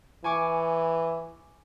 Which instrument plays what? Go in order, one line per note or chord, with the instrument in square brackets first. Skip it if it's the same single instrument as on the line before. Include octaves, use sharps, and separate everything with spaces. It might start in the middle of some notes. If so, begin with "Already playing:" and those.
[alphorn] E3 [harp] G#5 C#6 D6